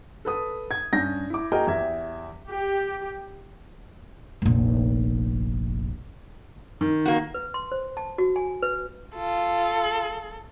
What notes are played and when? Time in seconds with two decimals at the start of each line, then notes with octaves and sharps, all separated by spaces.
0.25 A4 B4 D#6
0.71 G#6
0.93 G2 C#4 G6 A#6
1.30 E4 D6
1.52 A#3 F#4 G#4 A#4 D#5 G5
1.67 E2 G4 E5 G#6
2.49 G4
4.42 F1 A#1
6.81 D#3
7.06 A#3 F#4
7.34 B4
7.54 C6
7.72 C5
7.97 A5
8.18 F#4
8.36 G#5
8.63 B4
9.16 F4 A4